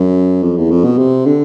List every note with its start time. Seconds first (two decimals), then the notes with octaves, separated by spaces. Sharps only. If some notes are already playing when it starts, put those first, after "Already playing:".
Already playing: F#2
0.43 F2
0.57 E2
0.71 F2
0.84 B2
0.98 C3
1.26 D3